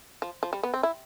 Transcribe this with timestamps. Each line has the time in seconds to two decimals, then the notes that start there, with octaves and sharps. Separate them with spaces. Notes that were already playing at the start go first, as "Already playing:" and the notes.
0.22 F3
0.43 F3
0.53 G3
0.63 B3
0.74 C4
0.83 E4